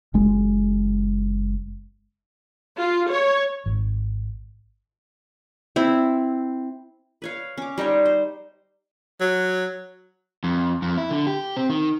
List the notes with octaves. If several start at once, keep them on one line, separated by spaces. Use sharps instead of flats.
F#1 G#3
F4
C#5
G#1
C4 E4
B4 C#5 F5
C#4 D6
G3 D#4 C5 C#5
C5
F#3
F2
F2
E4
D3
G4
C4
D#3